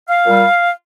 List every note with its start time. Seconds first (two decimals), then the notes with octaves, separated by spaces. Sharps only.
0.08 F5
0.26 A#2 G3